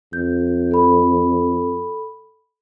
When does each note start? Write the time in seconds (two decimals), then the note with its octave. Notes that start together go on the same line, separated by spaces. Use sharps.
0.13 F2 G6
0.71 A4 B5